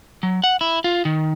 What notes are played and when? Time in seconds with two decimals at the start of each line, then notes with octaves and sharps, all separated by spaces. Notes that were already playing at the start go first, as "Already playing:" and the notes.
0.23 F#3
0.44 F#5
0.61 E4
0.84 F4
1.05 D#3